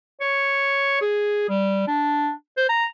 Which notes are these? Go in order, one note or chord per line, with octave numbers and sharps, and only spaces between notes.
C#5
G#4
G3
D4
C5
A#5